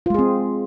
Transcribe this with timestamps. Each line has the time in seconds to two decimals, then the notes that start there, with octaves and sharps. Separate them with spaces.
0.06 F4
0.10 G#3
0.14 G#4
0.19 C4